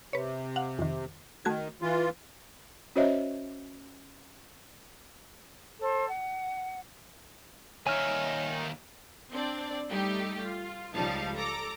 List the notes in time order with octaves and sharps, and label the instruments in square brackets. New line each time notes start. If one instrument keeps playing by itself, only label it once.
[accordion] C3 [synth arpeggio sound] B4 C#5
[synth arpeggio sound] F5 F#5
F2 D#3
[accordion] D#3 [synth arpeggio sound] A3 F#4 G#6
[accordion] E3 F4
[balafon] C#4 F#4 C5 C#5 D#5 E5
[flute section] A4 C5
F#5
[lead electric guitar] D#2 E5 [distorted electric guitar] D#3 D#4 [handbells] C#5 [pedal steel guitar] G#5 F6
[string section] C4 D4 D5
G3 A3 D#4 G4
F4
C#2 F3 G3 D#4 F5 A5
A4 A#5 D6